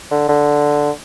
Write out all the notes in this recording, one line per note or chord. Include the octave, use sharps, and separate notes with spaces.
D3
D3